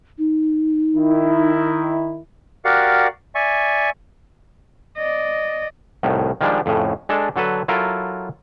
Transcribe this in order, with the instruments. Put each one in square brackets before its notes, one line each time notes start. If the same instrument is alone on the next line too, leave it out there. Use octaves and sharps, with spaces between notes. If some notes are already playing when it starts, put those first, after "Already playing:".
[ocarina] D#4
[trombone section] D#3 E4
[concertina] F#4 G4 A#4 D5 F5 F#5
D5 E5 G#5 C#6
[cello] D5 D#5
[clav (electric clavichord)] C2 A2 D#3
D#3 F3 G3 G#3 D4
F2 A2 C#3
G#3 D4 A4
D3 F#3 A4 B4
F#3 E4 F4 A4 A#4